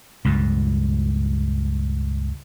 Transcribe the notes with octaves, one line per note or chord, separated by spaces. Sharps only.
C#2 G2 A#2